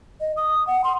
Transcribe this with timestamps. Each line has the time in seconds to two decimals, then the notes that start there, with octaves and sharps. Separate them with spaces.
0.21 D#5
0.37 D#6
0.67 F#5
0.84 C6